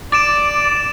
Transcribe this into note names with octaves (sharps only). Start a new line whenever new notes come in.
D5 D6 A6 D7 E7